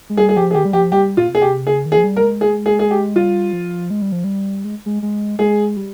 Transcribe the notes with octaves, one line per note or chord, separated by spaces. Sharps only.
G#3
G3 G#4
G#4
F3 G4
G#4
D#3 G4
G3
F3 G4
G3 G4
A#2 F4
C3
G#4
G4
C#3 G#4
D#3
G#4
F3
G3
A#4
G#3
G#4
G#4
G#4
G4
G3 F4
F3
G#3
G3
F3
G3
G#3
G#3
G#3
G#3 G#4
G3